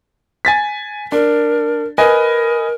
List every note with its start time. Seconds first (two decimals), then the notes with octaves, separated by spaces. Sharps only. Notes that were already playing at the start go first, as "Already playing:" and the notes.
0.45 G#5 A6 B6
1.12 D4 A#4
1.98 A#4 B4 D#5 G#5